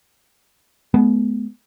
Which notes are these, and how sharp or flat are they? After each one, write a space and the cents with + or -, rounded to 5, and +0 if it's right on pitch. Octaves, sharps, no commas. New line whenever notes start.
G#3 +45 B3 +0